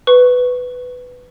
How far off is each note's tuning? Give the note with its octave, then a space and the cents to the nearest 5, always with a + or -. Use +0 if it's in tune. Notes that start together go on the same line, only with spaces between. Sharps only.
B4 +10 C#6 +0